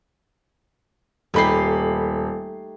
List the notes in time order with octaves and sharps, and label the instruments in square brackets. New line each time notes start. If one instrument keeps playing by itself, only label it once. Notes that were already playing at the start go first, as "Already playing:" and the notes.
[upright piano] D#1 B5 C7 [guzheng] A3 D#4 G4